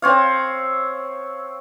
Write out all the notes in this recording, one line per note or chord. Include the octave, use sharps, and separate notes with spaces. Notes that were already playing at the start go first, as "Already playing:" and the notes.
C4 C#5 F5